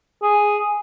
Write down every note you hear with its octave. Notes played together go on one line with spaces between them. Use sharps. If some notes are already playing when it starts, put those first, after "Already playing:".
G#4